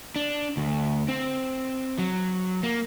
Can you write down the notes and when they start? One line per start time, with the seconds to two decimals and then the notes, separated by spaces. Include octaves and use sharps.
0.16 D4
0.57 D2
1.08 C4
1.99 F#3
2.63 A#3